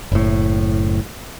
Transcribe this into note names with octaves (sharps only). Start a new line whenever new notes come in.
F#1 A2